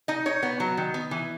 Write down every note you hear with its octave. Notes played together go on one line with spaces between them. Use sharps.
D#4 D#5
D#4 C#5
B3
F#3
D#3
B3
E3